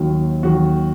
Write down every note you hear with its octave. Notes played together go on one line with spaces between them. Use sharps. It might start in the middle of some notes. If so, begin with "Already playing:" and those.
Already playing: D#2 D#3 F#3
D#2 D#3 F#3 F#4